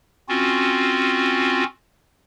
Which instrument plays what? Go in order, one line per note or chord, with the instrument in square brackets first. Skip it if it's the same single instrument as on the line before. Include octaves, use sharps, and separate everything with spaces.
[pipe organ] C4 C#4 F4 F#4